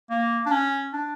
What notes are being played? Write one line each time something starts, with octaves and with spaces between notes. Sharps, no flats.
A#3
D4
C#4
D4